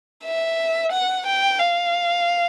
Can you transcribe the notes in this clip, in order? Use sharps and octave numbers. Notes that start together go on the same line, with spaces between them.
E5
F#5
G5
F5